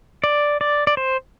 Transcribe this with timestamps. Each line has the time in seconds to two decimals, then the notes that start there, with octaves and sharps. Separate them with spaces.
0.24 D5
0.61 D5
0.87 D5
0.97 C5